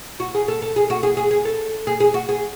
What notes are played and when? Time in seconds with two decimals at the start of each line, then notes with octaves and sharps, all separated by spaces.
0.20 F#4
0.35 G#4
0.48 A4
0.62 A4
0.76 G#4
0.90 F#4
1.03 G#4
1.17 G#4
1.31 G#4
1.45 A4
1.87 G#4
2.00 G#4
2.14 F#4
2.29 G#4